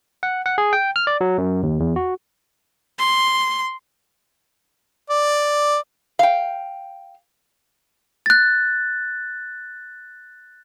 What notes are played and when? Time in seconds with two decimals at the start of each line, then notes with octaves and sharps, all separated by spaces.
0.23 F#5
0.46 F#5
0.58 G#4
0.73 G5
0.96 F6
1.07 D5
1.21 F#3
1.38 F#2
1.63 D#2
1.80 E2
1.96 F#4
2.99 C6
5.10 D5
6.19 F5 G5
8.26 F#6 A6